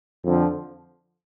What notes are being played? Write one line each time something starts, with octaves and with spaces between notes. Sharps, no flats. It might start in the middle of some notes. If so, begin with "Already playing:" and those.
F2 D3 F3